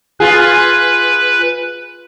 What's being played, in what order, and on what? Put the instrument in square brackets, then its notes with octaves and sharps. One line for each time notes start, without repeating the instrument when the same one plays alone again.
[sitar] F4 G#4 [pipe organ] B4